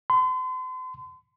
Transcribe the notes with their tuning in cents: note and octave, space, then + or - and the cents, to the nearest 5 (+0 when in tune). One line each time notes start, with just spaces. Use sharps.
C6 -40